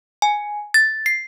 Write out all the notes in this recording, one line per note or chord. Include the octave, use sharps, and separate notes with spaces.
G#5
A6
C7